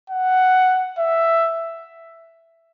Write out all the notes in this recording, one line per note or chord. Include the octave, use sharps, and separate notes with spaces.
F#5
E5